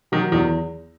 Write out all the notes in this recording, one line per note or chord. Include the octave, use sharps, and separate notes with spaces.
D#3 F#3
E2 D#3